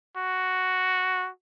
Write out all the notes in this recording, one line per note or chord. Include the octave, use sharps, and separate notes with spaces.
F#4